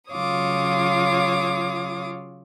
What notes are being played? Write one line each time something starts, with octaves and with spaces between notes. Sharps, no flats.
C#3 F#3 F4 C#5 D6 D#6